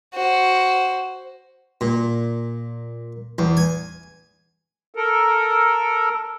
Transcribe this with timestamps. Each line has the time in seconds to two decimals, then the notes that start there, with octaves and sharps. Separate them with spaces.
0.15 F#4 C5
1.81 A#2
3.38 E2
3.57 G#5
4.94 A4 A#4